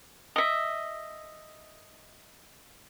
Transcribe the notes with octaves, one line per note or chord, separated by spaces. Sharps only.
D#5 E5